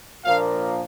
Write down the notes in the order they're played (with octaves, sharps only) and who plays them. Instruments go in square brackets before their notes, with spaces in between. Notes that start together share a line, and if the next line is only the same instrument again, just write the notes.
[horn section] A#2 F3 A#3 D4 F5